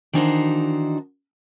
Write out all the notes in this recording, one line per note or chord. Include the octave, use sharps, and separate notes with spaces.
D#3 E3 D4 D#4 F#4 C5